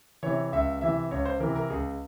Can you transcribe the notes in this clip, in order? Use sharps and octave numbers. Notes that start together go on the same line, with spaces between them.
C3 E3 C#5
C#2 E5
C3 E3 E5
C#2 C#5
C5
C3 E3 A#4
A#4
C#2 G#4